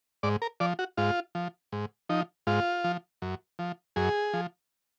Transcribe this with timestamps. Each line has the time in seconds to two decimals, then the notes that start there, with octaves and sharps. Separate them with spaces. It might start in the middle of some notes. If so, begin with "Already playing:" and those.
0.23 G#2 D5
0.42 A#4
0.60 F3 D5
0.79 F#4
0.97 G#2 F4
1.35 F3
1.72 G#2
2.09 F3 D#4
2.47 G#2 F4
2.84 F3
3.22 F#2
3.59 F3
3.96 F#2 G#4
4.34 F3